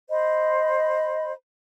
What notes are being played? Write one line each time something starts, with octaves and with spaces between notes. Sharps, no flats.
C5 D#5 B5